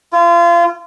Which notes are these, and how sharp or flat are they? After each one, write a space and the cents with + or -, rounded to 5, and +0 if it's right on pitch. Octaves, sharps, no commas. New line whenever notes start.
F4 -30